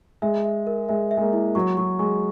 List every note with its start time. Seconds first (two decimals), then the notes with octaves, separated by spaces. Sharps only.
0.22 G#3 E5
0.45 E5
0.67 A#4
0.89 G#3 E5
1.11 E5
1.17 G#3
1.22 A#3
1.33 E4
1.55 F#3 C#6
1.77 F#3 C#6
1.99 G#3 C#6